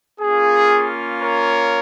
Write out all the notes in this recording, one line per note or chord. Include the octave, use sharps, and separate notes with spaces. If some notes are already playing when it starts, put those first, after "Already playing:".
A#3 C#4 F4 G#4
A#4 C#5